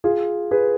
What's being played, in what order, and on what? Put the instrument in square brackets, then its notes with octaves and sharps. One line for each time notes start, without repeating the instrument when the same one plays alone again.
[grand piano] F4 G#4
G#4 B4